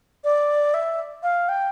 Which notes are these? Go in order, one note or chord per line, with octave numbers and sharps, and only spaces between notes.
D5
E5
F5
G5